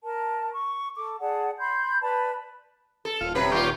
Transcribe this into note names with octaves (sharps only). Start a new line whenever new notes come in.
A#4 A5
C#6
A4 D6
G#4 D5 F#5 A5
B5 C6 G6
B4 D5 A5 B5
A4
D#1 F4
C3 F#3 B4 B5
D#2 C#4 F4 G4 D5